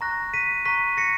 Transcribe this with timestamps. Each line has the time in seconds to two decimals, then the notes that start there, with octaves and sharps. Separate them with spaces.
0.01 A#5 C#6 F#6 A#6
0.34 B6 D#7
0.65 A#5 C#6 F#6 B6 D#7
0.97 A#6 C#7